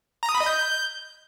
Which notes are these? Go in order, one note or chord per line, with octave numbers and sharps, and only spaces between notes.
A#5
D#6
B5
D#5
G6